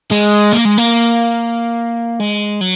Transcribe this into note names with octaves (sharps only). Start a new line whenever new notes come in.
G#3
A#3
G#3
A#3
G#3
F#3